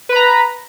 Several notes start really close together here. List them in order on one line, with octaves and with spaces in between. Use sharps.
B4 B5 A#5